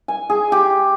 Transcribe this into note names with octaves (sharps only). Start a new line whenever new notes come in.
G#5
G#4
G4